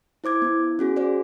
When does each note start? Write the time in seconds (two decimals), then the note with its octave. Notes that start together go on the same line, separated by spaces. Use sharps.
0.24 E4 C5 D6 G#6
0.42 B3 E4
0.79 C#4 F#4 G#4
0.96 F#4 G#4 C5 D5